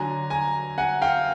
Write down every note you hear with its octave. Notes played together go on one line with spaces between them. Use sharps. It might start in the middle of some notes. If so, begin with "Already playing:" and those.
Already playing: D3 F#3 G#5 A#5
G#5 A#5
F#5 G#5
F5 G5